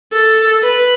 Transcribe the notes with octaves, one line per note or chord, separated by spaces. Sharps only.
A4
B4